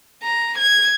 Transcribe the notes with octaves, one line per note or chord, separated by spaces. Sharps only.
A#5
G#6